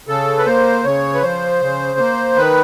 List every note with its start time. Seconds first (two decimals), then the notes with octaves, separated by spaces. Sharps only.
0.08 C#3 A4
0.38 B4
0.46 A#3 C5
0.84 C#3 C#5
1.15 B4
1.22 F3 C5
1.61 C#3
1.99 A#3
2.36 D#3 B4